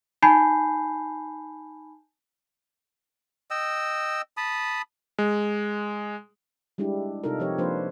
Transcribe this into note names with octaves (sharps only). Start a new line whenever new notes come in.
D#4 G#5 A5 B5 G6 C7
D#5 G5 E6
A5 B5 D#6
G#3
G3 G#3 D4 E4 G4
C3 D#4 F4 A4 A#4
F3 C4 G4 C#5
F3 A#3 D4 F4 B4 C5